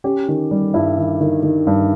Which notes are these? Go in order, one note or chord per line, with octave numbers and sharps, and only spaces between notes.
C#4 G4
D#3
G3
G2 E4
D#3
D#3
D#3
G2